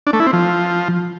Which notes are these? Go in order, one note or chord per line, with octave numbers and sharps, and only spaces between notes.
D4
A3
E4
C4
F3